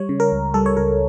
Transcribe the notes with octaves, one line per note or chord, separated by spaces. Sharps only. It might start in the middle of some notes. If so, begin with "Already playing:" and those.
Already playing: G3 C#5
C#3
A#4
C#2
G3 A4
C#5
C#2 A#4